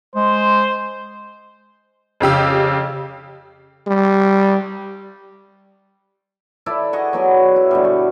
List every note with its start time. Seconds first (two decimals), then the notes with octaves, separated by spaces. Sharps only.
0.15 G#3 C5
2.20 F2 C#3 G4 E6
3.87 G3
6.66 E4 A4 B4 D5
6.93 G#4 D#5 F#5 C#6
7.13 F#3 B3 D5
7.56 E4
7.71 B2 D3 G3
7.85 C#6